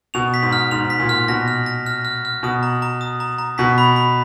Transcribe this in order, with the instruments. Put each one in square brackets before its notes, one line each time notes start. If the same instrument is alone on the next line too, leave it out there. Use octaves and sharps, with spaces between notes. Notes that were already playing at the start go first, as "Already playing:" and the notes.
[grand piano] B2 [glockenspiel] F7
[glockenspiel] B6
[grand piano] G#2
[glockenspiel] F6
[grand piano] G#2 [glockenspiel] F7
[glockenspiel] B6
[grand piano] A#2
[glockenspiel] F6
[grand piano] B2 [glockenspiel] A#6
[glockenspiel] F6
A#6
F6
F6
F6
[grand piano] B2 [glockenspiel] D#6
[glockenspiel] A#5
A#5
D#6
A#5
A#5
[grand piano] B2 [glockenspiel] B6
[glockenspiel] B5
B5